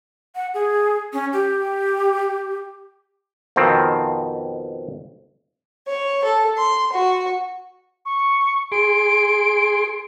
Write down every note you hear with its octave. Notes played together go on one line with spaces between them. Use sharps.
F#5
G#4
C#4
G4
F2 B2 D#3 C4
C#5
A4
C6
F#4
C#6
G#4 C6 D7